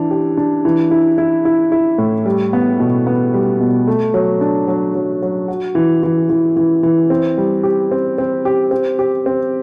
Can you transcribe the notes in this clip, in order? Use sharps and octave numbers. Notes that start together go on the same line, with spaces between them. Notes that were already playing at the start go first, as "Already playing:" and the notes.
Already playing: E3 D4
G4
D4
E3
E4
E4
E4
E4
A2
G3
B3
B2
B3
G3
B2
A3
F#3
D4
F#3
F#3
F#3
F#4
E3
E3
E3
E3
E3
C4
G3
G4
C4
C4
G4
C4
G4
C4